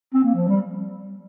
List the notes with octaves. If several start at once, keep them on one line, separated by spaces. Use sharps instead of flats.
C4
A#3
F3
G3